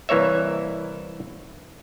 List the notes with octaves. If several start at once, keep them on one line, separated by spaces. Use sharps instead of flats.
C2 E3 A#3 C#5 E5